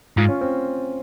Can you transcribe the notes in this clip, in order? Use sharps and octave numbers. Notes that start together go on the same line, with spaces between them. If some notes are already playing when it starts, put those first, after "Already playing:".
G#2 F4
C#4
C4